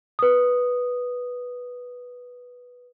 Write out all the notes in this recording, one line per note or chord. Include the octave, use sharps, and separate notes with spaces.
B4 D#6